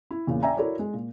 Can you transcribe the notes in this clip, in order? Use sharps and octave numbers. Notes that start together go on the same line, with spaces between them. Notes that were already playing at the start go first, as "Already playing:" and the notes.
E4
E2 A#2 C#3
D5 E5 G5 G#5 A#5
E4 F#4 A4 A#4 C#5 D5
G#3
A#2